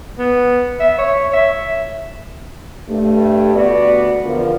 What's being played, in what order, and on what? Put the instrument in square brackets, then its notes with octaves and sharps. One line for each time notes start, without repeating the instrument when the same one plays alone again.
[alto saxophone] B3
E5
C#5
E5
[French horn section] G2 A3
D2 B3 F#4 D5
E2 D3 F3 B3 F4 A#4